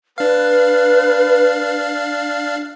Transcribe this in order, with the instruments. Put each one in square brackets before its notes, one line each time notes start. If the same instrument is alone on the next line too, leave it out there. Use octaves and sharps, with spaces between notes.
[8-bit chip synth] D4 F5 [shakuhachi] B4